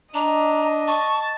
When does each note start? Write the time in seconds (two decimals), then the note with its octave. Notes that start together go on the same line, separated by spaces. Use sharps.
0.14 D4 D#5 A#5
0.88 A5 C#6